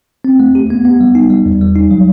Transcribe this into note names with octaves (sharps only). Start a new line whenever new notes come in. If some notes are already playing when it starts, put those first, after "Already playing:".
C4
A3
G4
B3
B3
G3
D#4
G3
E2
G3
D#4
F#3